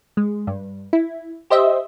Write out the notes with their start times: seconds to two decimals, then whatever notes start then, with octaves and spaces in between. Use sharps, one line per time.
0.17 G#3
0.47 G2
0.93 E4
1.50 G4 C5 D#5 E5